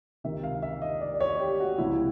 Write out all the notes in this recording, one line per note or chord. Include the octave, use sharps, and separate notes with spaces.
C#2 C3 D#3 E5
F5
E5
D#5
D5
D5
C#5
G4
F#4
C#2 C3 F3 E4